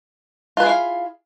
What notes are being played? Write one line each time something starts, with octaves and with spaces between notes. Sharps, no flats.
E4 F4 G#4 B4 F5